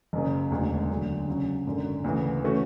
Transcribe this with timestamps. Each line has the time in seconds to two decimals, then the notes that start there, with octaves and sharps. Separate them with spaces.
0.13 F#1 F#2 C#3
0.51 E1 D2 D3 G#3
0.89 D2 D3 F#3
1.28 C#3 F#3 C#4
1.67 G#1 F#2 D3
2.04 D2 C#3 E3
2.43 E3 A3 C#4 F#4